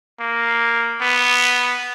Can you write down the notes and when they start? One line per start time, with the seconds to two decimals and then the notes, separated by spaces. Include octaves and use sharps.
0.20 A#3
1.01 B3